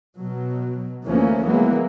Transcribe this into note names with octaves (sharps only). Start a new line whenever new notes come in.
B2 F#3
D2 E3 F3 A3 A#3 C#4
E3 F#3 G#3 A#3 B3